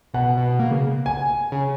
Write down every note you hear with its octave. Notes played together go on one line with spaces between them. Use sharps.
B2 F#5
B2
A#3
C#3
G#5
C#3